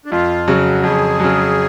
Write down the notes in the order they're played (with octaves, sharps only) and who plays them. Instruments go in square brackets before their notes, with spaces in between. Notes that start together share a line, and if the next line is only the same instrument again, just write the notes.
[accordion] D4
[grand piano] F2 [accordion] F4
[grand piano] C#3 F#3 [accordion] F#4
[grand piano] F2 [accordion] G#4
[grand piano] C#3 F#3